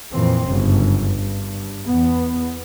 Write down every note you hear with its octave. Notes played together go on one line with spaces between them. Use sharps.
F2 A#2 E3 C4
G1 F#2 C#3
G2
E2 B3